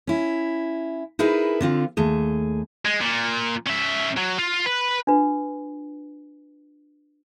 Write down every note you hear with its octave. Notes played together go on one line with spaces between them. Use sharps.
C#4 E4
D#4 E4 G#4 A#4 B4
D3 C4 F4
D#2 A3 G#4
G#3
A#2
C#4 E5
F#3
F4
B4
D4 F4 B4